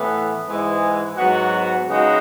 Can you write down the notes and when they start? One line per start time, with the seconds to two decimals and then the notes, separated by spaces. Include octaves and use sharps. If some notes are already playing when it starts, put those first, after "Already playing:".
Already playing: A2 E3 B3
0.46 G#2 E3 G#3
1.17 G#2 F#3 B3 F#4
1.88 C#3 G#3 B3 D#4 F#4